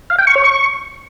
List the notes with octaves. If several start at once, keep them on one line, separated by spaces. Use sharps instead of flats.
F5
G5
C#6
C#5
C#6